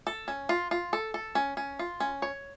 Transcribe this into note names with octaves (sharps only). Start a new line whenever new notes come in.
A4
C#4
F4
F4
A4
A4
C#4
C#4
F4
C#4
C#5